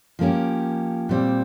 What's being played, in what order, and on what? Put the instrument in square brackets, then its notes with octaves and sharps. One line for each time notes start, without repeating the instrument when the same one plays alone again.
[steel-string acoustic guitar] F3 A#3 C#4 G4
A#2 G3 C4